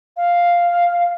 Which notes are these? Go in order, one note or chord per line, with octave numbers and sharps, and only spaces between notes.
F5